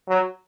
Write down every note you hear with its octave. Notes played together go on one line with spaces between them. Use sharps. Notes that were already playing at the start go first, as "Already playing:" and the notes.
F#3